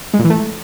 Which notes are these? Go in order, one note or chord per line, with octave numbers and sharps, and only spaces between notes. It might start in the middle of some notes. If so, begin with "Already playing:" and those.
G#3
A#2
E3
A3